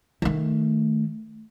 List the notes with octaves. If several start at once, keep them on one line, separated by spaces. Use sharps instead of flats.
D#3 A3